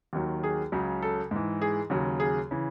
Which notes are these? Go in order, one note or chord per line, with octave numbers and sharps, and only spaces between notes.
D#2 D#3 F#3
G#4
C#2 C#3 F#3
A4
G#2 E3
G#4
D#2 C#3 F#3
G#4
C#3 E3